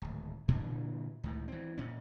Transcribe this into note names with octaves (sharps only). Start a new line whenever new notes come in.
D1 G#1
G2 A#2 D3 E3
C#2 A2 D#3
E3 C4
A#2 C#4